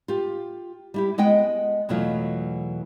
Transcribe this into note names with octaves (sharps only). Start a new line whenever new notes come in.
F4 G4
G3 E4 G4
G#3 B3 D#5 F#5 G5
E2 B2 E3 F#3 A3 F4